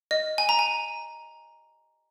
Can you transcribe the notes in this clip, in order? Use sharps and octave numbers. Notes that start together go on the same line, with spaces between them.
D#5
G#5
A#5
G#5